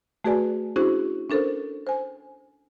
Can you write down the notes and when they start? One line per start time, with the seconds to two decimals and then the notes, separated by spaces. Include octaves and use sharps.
0.24 A3 F#4 G#4 B4 D5 G#5
0.76 C#4 D4 E4 F#4 G#4 C5
1.30 C#4 D4 A4 A#4 C5
1.87 C5 G#5